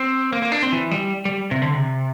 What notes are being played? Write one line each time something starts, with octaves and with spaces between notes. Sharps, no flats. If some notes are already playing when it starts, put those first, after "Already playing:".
Already playing: C4
A#3
A#3
D4
C4
E3
G3
G3
C3
D3
C3